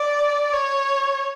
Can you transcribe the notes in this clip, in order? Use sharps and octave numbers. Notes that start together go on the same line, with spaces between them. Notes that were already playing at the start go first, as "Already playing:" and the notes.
Already playing: D5
C#5